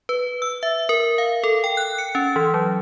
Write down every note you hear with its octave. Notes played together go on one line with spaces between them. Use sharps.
B4
E6
E5
A#4
F5
A4
G5
F#6
C#7
C#4
E3
F#3